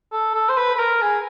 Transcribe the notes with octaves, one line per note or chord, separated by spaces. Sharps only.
A4
A4
C5
B4
B4
A#4
G#4